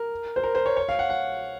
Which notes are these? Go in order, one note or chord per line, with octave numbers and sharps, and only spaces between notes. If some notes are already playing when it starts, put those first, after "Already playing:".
Already playing: A#4
C5
A#4
C5
C#5
C#5
F5
F#5
F#5